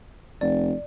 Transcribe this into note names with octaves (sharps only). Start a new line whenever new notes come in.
F1 D5